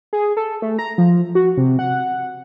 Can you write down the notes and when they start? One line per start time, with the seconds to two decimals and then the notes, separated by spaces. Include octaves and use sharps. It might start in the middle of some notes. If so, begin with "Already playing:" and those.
0.13 G#4
0.37 A4
0.62 A3
0.79 A#5
0.98 F3
1.35 F#4
1.57 C3
1.79 F#5